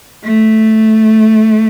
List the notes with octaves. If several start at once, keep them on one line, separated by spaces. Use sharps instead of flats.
A3